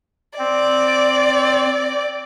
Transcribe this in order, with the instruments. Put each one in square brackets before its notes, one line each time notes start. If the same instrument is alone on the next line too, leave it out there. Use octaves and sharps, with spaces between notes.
[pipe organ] C4 [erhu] D5